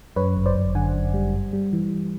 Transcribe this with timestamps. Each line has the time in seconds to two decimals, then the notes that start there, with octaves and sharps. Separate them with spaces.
0.16 F#2 B4 C#5
0.36 G1
0.46 C5 D5
0.56 G1
0.75 D3 F#5 G#5
0.95 F#2
1.14 G3
1.34 G2
1.53 G3
1.73 E3